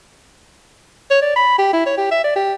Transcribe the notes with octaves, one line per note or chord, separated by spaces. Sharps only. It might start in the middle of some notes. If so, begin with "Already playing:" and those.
C#5
D5
B5
G4
E4
C#5
G4
E5
D5
G4